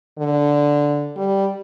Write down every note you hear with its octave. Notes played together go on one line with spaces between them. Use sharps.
D3
G3